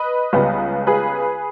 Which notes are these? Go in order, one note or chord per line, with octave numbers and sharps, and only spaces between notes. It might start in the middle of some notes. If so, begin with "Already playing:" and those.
Already playing: B4 D#5
C#2 C#3 G3 B3
G#4 B4